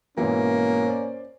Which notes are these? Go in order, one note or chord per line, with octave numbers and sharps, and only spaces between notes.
G#2 B2 E3 A#3 C#4
C5 D5